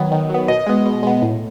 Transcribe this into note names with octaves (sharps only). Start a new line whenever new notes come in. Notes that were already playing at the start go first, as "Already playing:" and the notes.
Already playing: D#3 F#3 B3
D#3
F#3 B3
B2 D#5
G#3 B3
B2
G#3 B3
A2